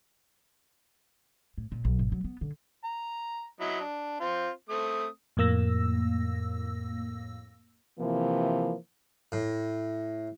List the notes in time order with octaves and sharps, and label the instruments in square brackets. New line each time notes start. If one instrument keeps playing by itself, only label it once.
[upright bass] A2
A#2
B1
G#1
F#3
B3
D3
[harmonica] A#5
F#3 E4 D#5
D4
C4 F4 C5
A3 C4 D#6
[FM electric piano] F2 A2 A#3 E6 A#6
[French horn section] C3 E3 F3 A#3
[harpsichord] A2